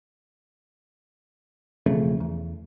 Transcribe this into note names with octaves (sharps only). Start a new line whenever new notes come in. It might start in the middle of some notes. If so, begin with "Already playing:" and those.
E1 F2 C#3 A3
E2